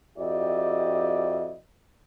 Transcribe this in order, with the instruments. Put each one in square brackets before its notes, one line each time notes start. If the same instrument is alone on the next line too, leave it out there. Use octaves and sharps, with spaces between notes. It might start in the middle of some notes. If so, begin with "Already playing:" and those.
[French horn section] F2 E4 F#4 G4 D5 D#5